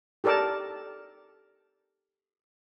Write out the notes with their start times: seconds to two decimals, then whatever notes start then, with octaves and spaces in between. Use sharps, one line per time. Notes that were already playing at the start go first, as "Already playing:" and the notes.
0.24 G4 A4 A#4 D5 A5